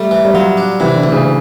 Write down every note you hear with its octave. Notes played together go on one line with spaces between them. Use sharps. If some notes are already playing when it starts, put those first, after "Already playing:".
Already playing: G3 A3
E3
G3
F#3 F4
D4
C3 E3
D3
D2
C#3